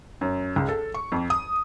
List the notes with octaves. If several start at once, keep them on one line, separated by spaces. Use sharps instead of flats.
F#2
C#2
A4
C#6
F2
D#6